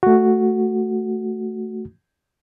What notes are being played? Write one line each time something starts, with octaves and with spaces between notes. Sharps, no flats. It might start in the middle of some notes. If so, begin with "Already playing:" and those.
A3 F#4